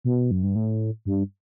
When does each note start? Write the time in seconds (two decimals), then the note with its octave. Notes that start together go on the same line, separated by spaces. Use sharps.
0.05 B2
0.31 F#2
0.43 G2
0.55 A2
1.05 G2